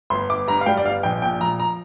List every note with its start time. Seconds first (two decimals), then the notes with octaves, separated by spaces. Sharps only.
0.10 G1 C6
0.29 G1 D6
0.48 G2 A#5
0.61 F5
0.66 G3 G5
0.77 D5
0.85 G1 F5
1.03 A#1 G5
1.22 A#2 G5
1.40 F3 A#5
1.60 A#5